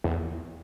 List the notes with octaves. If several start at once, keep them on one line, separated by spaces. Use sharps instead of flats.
E2